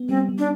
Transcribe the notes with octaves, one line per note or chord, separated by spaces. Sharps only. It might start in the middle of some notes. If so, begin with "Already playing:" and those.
Already playing: B3
G3 C4
G3
D4